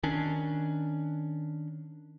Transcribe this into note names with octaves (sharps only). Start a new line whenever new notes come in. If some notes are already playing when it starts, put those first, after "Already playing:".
D#3 C#4 D4